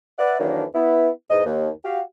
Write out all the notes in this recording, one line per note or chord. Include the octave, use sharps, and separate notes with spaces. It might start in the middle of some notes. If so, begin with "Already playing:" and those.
B4 D5 E5 F#5
F2 D#3 E3 F#3 A#3 D4
B3 E4
E2 G#2 D#5
D#2
F#4 G4 F5